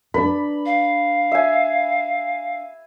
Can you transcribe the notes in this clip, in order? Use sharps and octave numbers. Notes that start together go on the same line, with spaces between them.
D4 B4 B5
F5
E5 G#5